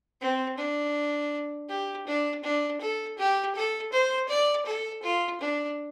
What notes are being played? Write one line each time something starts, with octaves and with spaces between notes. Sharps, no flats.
C4
D4
G4
D4
D4
A4
G4
A4
C5
D5
A4
F4
D4